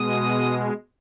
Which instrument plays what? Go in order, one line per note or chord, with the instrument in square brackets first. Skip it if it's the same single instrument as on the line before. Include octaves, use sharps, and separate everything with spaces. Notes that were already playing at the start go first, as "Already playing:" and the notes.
Already playing: [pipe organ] B2 G#3 D#6